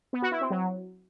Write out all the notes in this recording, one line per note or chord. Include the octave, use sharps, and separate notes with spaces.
B3
F#4
E4
C4
F#3